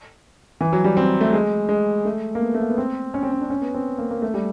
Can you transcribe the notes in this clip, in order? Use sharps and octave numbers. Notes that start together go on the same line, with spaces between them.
E3
F#3
G3
C4
A3
G#3
G#3
A3
A#3
B3
A3
A#3
B3
C4
C#4
C4
C#4
D4
C#4
B3
C4
A#3
A#3
A3
G3